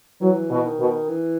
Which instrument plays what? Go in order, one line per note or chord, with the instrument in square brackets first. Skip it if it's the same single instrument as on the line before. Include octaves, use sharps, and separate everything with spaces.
[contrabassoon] E3 [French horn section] F#3
[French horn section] B2
[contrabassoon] D#3
[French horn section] B2
[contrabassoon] E3